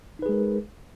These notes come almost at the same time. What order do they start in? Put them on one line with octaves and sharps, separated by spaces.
D#4 B4 G#4 G#3 A#4